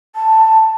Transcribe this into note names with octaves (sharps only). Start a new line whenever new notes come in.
A5